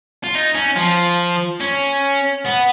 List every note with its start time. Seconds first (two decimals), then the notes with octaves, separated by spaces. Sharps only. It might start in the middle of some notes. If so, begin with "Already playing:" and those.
0.24 F4
0.35 D#4
0.55 C#4
0.76 F3
1.60 C#4
2.45 B3